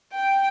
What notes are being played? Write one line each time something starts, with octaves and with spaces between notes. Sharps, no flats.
G5